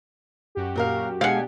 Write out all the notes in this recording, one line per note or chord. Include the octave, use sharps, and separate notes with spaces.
F#2 F#4 G4
A#2 A#4 F5
B2 G#3 D4 G4 F5 F#5 G#5